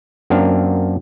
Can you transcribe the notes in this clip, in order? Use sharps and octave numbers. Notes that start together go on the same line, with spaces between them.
F#2 A#3 C4 D4 F5